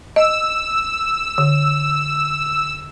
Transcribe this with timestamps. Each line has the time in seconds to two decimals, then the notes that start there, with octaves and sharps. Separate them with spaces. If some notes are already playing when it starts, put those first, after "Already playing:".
0.16 D#5 E6
1.38 D3